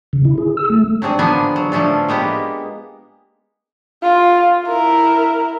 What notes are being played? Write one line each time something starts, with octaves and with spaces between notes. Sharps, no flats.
C#3
E4
G#4
E6
A3
F#3 C4 D4 G#4
D3 F3 A#3 B3 D4 G#5
F#3
F3 A3 C#4 D4 F4
G#3 A#3 B3 G4
F4
E4 A#4